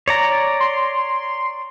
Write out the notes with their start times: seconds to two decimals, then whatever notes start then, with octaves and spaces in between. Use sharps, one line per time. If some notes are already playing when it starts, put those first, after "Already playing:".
0.08 C#5 D5 A#5
0.60 C6